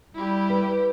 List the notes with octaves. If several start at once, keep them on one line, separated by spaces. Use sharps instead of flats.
G3 E4 G4
B4